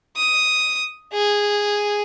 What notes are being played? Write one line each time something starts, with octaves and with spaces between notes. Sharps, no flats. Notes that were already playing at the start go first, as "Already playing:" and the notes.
D#6
G#4